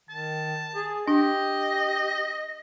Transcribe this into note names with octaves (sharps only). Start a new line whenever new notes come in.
D#3 A5
G#4
D4 G4 D#5